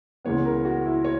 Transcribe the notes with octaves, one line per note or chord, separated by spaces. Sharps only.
C#2 C#3 E3 B3 C#5
A#4
F#4
E4
C#5